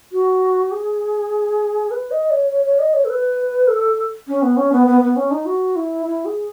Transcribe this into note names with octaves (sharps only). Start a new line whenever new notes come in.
F#4
G#4
B4
D#5
C#5
C#5
C#5
D#5
C#5
A4
B4
A4
C#4
B3
C#4
B3
B3
B3
C#4
D#4
F#4
E4
E4
G#4